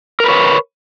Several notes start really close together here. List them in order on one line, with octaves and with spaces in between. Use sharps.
A#4 B4 C#5